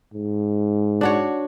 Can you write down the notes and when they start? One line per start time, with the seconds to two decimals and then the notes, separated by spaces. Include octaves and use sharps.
0.13 G#2
1.01 D4 F#4 C#5